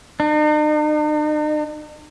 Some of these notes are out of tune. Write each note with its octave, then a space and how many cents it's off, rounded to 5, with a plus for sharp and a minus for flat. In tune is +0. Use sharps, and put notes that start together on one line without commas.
D#4 -45